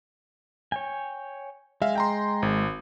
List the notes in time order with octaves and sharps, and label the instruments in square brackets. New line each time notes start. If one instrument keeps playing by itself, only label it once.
[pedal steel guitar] C#5 G5 G#5
[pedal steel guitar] G#3 [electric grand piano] E5 F5
[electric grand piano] G5 A#5 C6
G#1